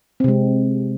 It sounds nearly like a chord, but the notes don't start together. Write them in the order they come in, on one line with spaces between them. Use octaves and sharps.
C4 C3 G#3